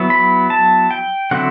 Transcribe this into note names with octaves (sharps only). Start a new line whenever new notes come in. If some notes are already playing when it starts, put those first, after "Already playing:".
Already playing: F#3 B3 E4
B5
A5
G5
D3 F#3 C4 E4 F#5